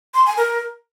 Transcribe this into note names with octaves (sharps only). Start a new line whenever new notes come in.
C6
G#5
A#4